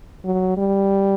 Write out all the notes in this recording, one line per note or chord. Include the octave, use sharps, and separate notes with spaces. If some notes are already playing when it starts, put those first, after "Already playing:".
F#3
G3